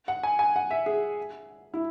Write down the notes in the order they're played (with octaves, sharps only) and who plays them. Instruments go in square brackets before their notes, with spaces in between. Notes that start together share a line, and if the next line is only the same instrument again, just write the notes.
[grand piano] F#5
G#5
G#5
F#5
E5
G#4
E4